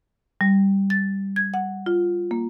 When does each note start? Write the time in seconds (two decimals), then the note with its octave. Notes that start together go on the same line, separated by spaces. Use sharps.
0.41 G3
0.90 A6
1.36 G#6
1.54 F#5
1.86 F4
2.31 A#3